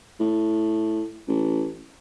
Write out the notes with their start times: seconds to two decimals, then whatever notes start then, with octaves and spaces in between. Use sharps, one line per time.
0.20 A2
1.28 A1